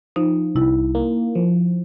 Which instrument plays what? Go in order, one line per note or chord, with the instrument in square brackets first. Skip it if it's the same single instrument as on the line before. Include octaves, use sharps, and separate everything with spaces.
[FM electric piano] F3 [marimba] D#4
[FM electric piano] C2 [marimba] E4
[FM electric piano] A#3
F3